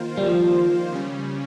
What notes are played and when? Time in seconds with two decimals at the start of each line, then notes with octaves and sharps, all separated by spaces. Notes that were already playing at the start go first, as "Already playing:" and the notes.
Already playing: D#3 A#3 F4 C5
0.17 G3
0.26 F3
0.92 C#3 G3 C#4